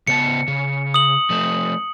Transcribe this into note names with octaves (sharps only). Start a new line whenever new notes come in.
C#3 B3 A5 C#7
C#3
D#6 F#7
F3 A3